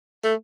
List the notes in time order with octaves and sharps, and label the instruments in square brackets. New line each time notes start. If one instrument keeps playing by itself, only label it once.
[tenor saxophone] A3